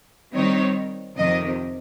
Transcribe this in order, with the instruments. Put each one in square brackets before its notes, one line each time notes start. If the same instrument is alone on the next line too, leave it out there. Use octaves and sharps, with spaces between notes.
[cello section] D#3 G3 C4 D#4 C#5
F2 C3 D#3 D#5